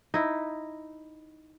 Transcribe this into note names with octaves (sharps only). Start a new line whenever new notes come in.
D#4 E4